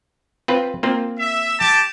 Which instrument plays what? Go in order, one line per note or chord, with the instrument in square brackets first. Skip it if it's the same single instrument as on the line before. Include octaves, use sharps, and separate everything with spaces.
[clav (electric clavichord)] C4 F4 B4
A#3 C4 F4
[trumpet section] E5
G4 A5